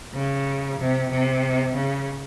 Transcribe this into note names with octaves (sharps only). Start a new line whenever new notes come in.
C#3
C3
C3
C#3